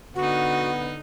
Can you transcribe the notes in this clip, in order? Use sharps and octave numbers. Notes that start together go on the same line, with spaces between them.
D3 B3 D#4 F#4 F#5